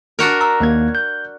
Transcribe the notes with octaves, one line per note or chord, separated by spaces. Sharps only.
D4 F#4 A#4
A#5 E6
D#2 A#3 G#6
G6